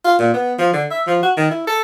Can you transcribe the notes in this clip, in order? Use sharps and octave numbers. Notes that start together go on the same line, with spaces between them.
F4
A#2
B3
F3
D3
E5
F3
F#4
D#3
E4
A4